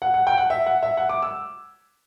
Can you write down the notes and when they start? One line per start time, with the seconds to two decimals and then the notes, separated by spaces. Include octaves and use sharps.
0.02 F#5
0.14 F#5
0.27 G5
0.38 F#5
0.50 E5
0.66 F#5
0.83 E5
0.97 F#5
1.09 D6
1.22 E6